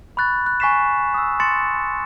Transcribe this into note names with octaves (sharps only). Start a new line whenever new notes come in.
B5 C#6 F#6 A6
F#6
G#5 C#6 F#6 B6 C7 E7
D#6 E6
C6 A6 C#7 E7